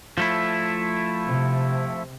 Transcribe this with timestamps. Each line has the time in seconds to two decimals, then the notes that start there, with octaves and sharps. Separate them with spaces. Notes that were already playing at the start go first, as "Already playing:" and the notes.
0.18 F3 A3 E4
1.26 C3